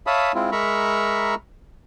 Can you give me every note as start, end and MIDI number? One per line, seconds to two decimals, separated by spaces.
0.07 0.32 73
0.07 0.32 76
0.07 0.32 77
0.07 0.32 81
0.07 0.32 83
0.07 0.32 87
0.35 0.50 56
0.35 0.50 60
0.35 0.50 64
0.35 0.50 65
0.52 1.35 56
0.52 1.35 70
0.52 1.35 76
0.52 1.35 82
0.52 1.35 83
0.52 1.35 85